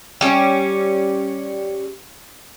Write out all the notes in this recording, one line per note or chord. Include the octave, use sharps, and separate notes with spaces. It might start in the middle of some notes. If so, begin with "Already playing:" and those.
G3 C#4